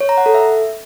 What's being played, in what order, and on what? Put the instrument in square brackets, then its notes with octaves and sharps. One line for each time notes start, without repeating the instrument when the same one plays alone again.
[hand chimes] C#5
A#5
F#5
A4
E5